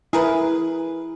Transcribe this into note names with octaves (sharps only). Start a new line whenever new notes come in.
E4 G#4 A#4 B4